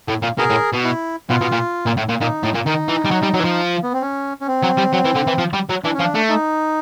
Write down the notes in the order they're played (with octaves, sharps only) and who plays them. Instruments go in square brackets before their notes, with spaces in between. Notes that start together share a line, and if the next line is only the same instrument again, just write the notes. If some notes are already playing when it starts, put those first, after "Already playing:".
[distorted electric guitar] A2
A#2
[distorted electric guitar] B2 [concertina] G#4 A#4
[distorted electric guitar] A2
B2
[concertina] E4
[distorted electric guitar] B2 [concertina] F4
[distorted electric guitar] B2
A#2
A#2
A2
A#2
[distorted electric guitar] A#2 [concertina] D#4
[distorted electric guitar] A2
A#2
[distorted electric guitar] D#3 [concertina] D#4
[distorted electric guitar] E3
G3
F#3
G3
F#3
E3
F3
[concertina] B3
C4
C#4
C#4
C4
[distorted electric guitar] F#3
G3
F#3
E3
D3
E3
F3
G3
F#3
[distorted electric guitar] E3 [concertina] D4
[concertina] C#4
[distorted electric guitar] F3
[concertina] D4
[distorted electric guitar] A3
[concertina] D#4